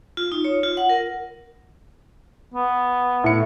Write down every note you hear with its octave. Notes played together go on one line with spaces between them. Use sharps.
F4
D#4
C#5
F4
F#5
A#4
B3
A2 C#7